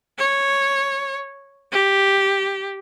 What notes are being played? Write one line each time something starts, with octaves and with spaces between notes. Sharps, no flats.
C#5
G4